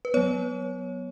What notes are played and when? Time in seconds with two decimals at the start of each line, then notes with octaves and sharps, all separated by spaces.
0.05 B4
0.14 F#3 B3 C#5